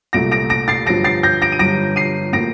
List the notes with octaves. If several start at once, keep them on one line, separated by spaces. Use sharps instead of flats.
C2 A#2 A3 A#6 D7
A#6 D7
A#6 D7
A6 C7
G1 G2 F3 A#6 D7
A6 C7
G6 A#6
A#6 D7
D#7
G1 G2 F3 A#6 D7
C7 D#7
A2 F3 A#3 A#6 D7